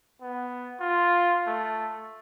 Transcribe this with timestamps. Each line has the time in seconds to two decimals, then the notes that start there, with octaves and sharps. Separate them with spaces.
0.21 B3
0.80 F4
1.47 A3